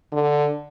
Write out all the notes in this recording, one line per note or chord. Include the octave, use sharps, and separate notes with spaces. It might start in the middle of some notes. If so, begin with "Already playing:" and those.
D3